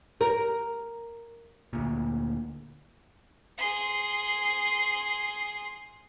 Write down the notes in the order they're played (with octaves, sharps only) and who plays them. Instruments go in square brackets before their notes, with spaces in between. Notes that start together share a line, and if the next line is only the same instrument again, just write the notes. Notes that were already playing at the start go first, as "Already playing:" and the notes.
[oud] A#4
[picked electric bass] D2 A#2
[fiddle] G#4 C6